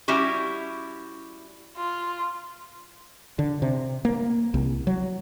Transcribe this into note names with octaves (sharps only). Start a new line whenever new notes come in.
G3 C#4 E4 F#4 G4
F4
D3
C3
A#3
C2
F#3